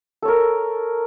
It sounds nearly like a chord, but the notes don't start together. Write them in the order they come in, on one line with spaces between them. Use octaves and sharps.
A4 C#5 A#4